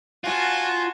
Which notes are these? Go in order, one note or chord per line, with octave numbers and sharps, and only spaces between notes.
F4 F#4 G#5 A5